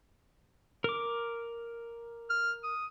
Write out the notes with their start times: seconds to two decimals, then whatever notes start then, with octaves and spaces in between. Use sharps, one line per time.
0.84 A#4 D6
2.30 F6
2.64 D#6